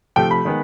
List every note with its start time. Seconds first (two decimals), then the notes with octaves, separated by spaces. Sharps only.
0.16 C3 F3 A3 G5
0.31 B5
0.45 D#3 G#3 B3